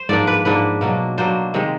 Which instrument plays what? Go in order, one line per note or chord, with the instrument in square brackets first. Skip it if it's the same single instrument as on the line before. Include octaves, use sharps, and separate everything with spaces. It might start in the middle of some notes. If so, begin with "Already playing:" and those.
Already playing: [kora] C5
G#2 F3 A#3 D4 D5
B4
G#2 F3 A#3 D4 B4
B2 F#3 A#3 D4
B2 F#3 A#3 D4 C5
C3 D#3 G#3